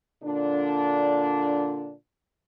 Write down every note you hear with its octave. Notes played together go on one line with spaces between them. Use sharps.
A#2 D3 D4